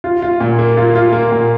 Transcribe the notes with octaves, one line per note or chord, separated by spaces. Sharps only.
F4
F4
A#2
A#3
F4
F4
A#3
A#2